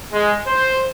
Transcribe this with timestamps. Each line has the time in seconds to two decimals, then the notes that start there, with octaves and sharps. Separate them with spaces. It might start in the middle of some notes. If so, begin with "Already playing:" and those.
0.11 G#3
0.45 C5